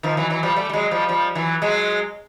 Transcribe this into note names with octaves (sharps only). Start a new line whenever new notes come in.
D#3 F3
E3 F#3
E3 F#3
F3 G3
G3 A3
G3
F#3 G#3
F3 G3
F3 G3
E3 F#3
F#3 G#3